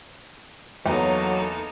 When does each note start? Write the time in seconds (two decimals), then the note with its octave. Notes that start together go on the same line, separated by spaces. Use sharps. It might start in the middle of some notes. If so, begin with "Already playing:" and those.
0.86 E2 F#3 A#3 D#4 A4